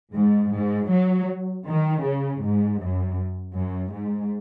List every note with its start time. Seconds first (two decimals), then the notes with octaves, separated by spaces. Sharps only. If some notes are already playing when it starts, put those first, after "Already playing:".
0.14 G#2
0.52 G#2
0.91 F#3
1.66 D#3
2.04 C#3
2.42 G#2
2.80 F#2
3.55 F#2
3.93 G#2